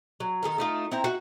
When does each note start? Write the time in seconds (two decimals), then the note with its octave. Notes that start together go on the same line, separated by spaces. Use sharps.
0.20 F#3
0.43 D#3 F3 A4 A#4
0.58 A3 D#4 F4
0.91 C4 E4 G5 A#5
1.04 F#4 E5